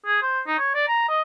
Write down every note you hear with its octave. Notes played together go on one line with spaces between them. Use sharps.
G#4
C5
D#4
C#5
D5
A#5
D#5